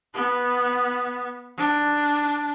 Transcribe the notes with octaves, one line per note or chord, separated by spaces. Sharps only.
B3
D4